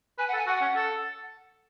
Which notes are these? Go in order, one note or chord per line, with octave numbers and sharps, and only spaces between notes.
B4 G#5
F#5
A4
G#5
F#4 F#5
C#4
A4